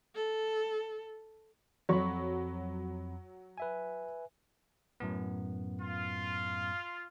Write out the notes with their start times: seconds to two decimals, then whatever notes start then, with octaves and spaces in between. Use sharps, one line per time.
0.15 A4
1.89 F2 F#3 B5 C#6
3.58 B4 E5 G#5
5.00 F#2 A2 B3
5.82 F4